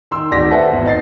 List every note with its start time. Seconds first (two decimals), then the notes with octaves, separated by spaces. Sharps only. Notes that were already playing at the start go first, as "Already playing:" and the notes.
0.11 D#3 C6 E6
0.31 D1 D#3 F#4 D5 A#6 B6
0.51 A4 B4 C5 E5 F#5
0.71 G#1 E2
0.86 D#4 A6 C7